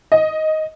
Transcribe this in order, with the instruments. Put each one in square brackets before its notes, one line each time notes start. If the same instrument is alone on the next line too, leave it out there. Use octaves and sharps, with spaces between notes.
[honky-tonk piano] D#5